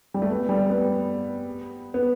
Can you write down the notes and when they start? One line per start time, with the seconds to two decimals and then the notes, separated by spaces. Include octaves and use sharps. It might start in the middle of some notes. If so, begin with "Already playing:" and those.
0.14 G3
0.22 A3
0.30 B3
0.49 G3
0.70 B3
1.94 B3